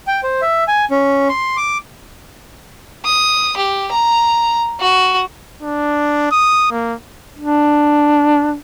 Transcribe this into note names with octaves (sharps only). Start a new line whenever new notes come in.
G5
C5
E5
G#5
C#4
C6
D6
D#6
G4
A#5
F#4
D4
D#6
A#3
D4